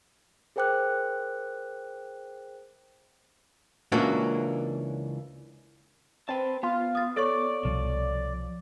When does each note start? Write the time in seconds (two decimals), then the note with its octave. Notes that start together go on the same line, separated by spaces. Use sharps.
0.56 G#4 A#4 C5 G5 D6 F#6
3.92 C#2 E3 A#3 C#4 D4 F#4
6.29 C4 B4 A5
6.63 B3 F4
6.95 D#6 A6
7.16 A4 C#5 D5 C#6
7.65 C2 B2 F3